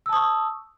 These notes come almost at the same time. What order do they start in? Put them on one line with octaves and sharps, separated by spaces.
E6 A5 D#6 C#6